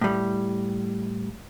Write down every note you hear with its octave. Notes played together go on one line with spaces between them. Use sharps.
A2 G3